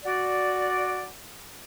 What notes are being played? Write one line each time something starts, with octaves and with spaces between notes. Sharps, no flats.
F#4 D5